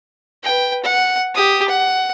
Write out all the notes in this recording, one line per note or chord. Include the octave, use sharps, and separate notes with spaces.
B4 G5
F#5
G4 D#6
F#5